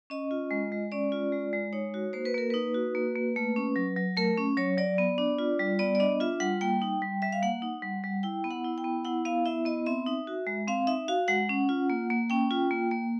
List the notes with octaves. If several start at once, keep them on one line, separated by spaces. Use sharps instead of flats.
C#4 D#5
F4
G#3
G#3
C#4 D5
F4
G#3
G#3
D#4 C#5
F#4
A#3 C5
B4
A#3 A#4
D#4 B4
F#4
A#3
A#3
A3
C#4
F#3
F#3
A3 A#4
C#4
F#3 C#5
F#3 D5
B3
D4
F4
G3
B3 D5
D5
D4 D#5
F4 E5
G3 F#5
A#3 G5
D#4
G3
G3 E5
F5
A#3 F#5
D#4
G3
G3
E4 G5
B3
F#5
E4
G5
B3
E4 F#5
B3 F5
E4 E5
B3 D#5
C4 E5
D#4
F#4
G#3
C4 F5
D#4 E5
F#4 F5
G#3 F#5
C#4
F4
A#3
A#3
C#4 G5
F4
A#3
A#3